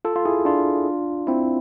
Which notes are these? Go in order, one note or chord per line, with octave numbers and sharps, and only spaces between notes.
F4 A4
F4
E4 G#4
D4 F4
C4 E4